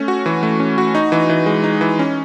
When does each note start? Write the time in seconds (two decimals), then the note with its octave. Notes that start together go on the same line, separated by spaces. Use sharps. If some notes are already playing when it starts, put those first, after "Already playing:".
Already playing: A3 C#4
0.08 F#4
0.26 E3
0.43 A3
0.60 C#4
0.78 F#4
0.95 D#4
1.12 E3
1.29 E3
1.46 G#3
1.64 D#4
1.81 E3
1.99 C#4